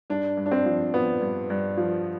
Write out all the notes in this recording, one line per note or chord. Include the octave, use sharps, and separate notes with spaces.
G2 D4
G2
D4
C4
F3
F3 B3
G2
G2
F3